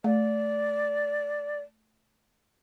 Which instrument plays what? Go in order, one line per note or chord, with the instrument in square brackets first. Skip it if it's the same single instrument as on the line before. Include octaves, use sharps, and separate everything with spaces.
[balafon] A3 [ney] D5